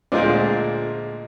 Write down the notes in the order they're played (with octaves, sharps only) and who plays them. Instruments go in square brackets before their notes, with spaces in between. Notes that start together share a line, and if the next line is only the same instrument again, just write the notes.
[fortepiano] D2 A#2 G#3 [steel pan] F4 C5 D5 [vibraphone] D#5